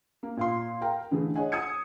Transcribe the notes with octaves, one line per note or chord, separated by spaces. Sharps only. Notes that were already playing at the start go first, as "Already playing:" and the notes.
A#3
A#2 F5 C6
A#4 F5 G5 A#5
D3 E3 A3 G#4
G#4 C#5 D#5 F#5 G#5
D#6 E6 G#6 C#7